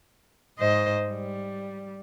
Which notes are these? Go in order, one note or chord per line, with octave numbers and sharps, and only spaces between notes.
G#2 C5 D#5
G3